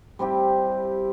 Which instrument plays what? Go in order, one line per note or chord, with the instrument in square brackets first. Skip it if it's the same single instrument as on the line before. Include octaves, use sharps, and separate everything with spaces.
[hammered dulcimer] G3 C4 E4 G4